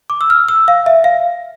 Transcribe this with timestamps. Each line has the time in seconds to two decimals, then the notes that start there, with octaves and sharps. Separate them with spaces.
0.10 D6
0.21 E6
0.30 F6
0.48 E6
0.68 F5
0.86 E5
1.04 F5